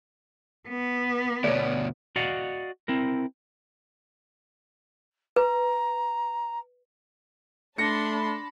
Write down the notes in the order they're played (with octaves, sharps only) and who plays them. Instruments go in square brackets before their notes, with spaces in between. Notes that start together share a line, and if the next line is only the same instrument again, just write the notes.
[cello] B3
[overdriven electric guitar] D2 B2 [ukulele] C#5 D5
[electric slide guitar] F#4 D5 D#5 F5 F#5
C4 E4 A#4
[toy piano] B4 [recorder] A#5
[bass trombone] A3 [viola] D4 C6 [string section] A5 B5 [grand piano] A#6 C#7